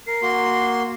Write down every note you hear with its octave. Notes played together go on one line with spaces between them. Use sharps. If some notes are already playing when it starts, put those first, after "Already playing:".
A#4 C7
A#3 F#4 C6